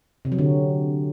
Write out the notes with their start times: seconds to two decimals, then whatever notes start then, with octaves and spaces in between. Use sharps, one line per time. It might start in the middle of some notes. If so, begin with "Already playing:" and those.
0.25 C3
0.32 F#3
0.39 D3